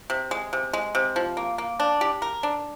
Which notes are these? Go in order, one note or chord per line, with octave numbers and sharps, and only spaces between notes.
C3
G#3
C3
G#3
C3
F3
A#3
A#3
D4
G4
A#4
D4